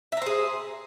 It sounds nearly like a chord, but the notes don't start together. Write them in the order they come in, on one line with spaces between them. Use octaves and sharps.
E5 A#5 C5 G#4